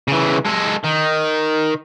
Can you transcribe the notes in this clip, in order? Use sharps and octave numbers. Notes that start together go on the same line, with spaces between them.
C#3 E3
G#3 A4
D#3